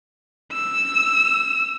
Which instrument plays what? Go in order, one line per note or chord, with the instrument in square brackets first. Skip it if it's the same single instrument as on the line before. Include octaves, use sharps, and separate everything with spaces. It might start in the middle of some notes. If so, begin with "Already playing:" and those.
[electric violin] E6